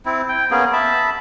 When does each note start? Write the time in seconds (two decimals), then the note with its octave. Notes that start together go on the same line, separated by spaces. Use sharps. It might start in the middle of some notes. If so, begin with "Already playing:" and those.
0.06 C4 E4
0.29 G5
0.51 A#3 B3 C#4 G#4
0.73 E5 A5 B5